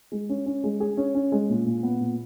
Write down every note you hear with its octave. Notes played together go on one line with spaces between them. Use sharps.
G#3
C#4
C#4
G#3
G#4
C#4
C#4
G#3
A#2
A#2
B3
A#2